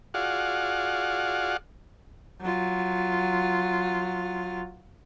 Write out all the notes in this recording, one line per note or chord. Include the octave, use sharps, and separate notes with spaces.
F4 F#4 G#4 D5 F5 F#5
F#3 F4